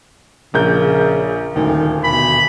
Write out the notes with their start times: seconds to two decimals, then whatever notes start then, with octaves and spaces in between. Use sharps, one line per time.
0.54 A#1 C#3 A#4 G6
1.55 D#1 D2 D#3
2.04 B2 B5